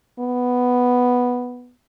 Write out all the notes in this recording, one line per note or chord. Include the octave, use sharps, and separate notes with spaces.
B3